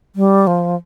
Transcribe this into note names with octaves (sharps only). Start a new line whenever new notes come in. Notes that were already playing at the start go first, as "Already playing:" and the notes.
G3
F3